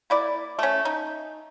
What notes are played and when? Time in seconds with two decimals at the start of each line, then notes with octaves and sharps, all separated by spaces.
0.10 A#3 E4 D5
0.59 A3 C#4
0.85 D#4